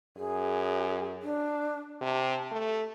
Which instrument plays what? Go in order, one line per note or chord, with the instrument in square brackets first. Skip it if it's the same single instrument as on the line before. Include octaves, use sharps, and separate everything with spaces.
[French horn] F#2 [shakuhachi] G#4
[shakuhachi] D4
[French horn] C3 [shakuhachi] A5
[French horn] A3